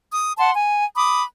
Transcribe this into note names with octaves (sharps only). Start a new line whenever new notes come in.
D#6
F#5 A5 C6
G#5
B5 D6 D#6